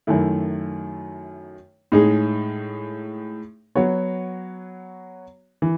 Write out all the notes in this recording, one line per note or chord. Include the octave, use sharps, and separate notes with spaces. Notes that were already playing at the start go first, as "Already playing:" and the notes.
F#2 D#3 A3 E4
A2 G#3 D#4 G#4
F#3 B3 F#4 C#5
E3